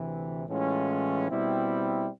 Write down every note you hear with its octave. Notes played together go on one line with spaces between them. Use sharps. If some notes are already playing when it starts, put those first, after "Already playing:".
Already playing: D2 C3 E3
A2 E3 G#3 C#4 F4
B2 G3 C4 E4